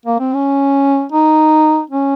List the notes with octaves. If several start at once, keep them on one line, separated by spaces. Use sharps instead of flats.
A#3
C4
C#4
D#4
C#4